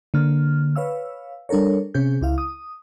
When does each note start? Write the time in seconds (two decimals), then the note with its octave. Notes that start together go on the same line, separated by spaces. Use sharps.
0.14 D3 A#3 F6
0.76 B4 C#5 F5 E6
1.49 G3 D4 A4 A#4 C#5
1.94 C3 C#4 G#4 G6
2.21 C#2 E4 F5
2.38 D#6